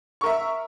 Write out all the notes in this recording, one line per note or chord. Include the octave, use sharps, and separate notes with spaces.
A#4 E5 C#6